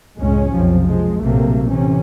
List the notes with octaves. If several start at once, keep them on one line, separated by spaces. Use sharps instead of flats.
C#2 F#2 A2 G#3 C#4
B1 F2 C3 F3
F3 G#3
A#1 A2 C3 F#3 A3 A#3
A2 C3 E3 C#4